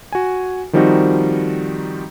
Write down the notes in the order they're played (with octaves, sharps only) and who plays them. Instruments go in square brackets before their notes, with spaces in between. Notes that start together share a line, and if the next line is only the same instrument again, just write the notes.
[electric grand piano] F#4 G#5
D#3 F3 G3 C4 D#4 F#4